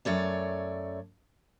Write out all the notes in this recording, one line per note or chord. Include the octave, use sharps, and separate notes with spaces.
F#2 A3 C#5 D5